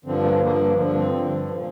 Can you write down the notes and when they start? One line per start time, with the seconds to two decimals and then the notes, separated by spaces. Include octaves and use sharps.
0.05 G2 D3 F3 C4
0.24 A#3
0.41 G2 D3 F3 A#3
0.77 G2 D3 F3 A#3
0.95 C4
1.14 G2 D3 F3
1.49 A#2 F3